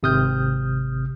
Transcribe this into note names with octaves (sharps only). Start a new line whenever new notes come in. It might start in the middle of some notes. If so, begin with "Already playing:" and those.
G#1 C3 D#6 F6 G6